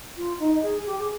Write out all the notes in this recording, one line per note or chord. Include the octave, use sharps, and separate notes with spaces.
F4
D#4
G#4
G4
G#4